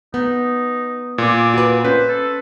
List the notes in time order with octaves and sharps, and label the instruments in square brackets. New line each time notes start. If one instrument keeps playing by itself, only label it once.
[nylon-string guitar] B3 [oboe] D#4
[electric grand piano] A#2 [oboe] D5
[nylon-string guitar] F#4 B4
[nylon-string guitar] C#4 [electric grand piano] B4 [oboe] C5
[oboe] A4